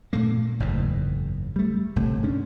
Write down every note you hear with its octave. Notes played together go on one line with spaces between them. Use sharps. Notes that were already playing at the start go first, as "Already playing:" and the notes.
A#2 A3 A#3
F#1 E2 G#2
G3 A3
G1 C3 A3
G#3 C#4 D4